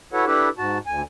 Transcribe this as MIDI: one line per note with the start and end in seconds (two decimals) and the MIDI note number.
0.13 0.25 64
0.13 0.25 66
0.13 0.25 69
0.13 0.25 71
0.13 0.25 73
0.13 0.25 78
0.26 0.49 62
0.26 0.49 64
0.26 0.49 67
0.26 0.49 69
0.26 0.49 71
0.58 0.78 44
0.58 0.78 66
0.58 0.78 81
0.87 1.02 38
0.87 1.02 80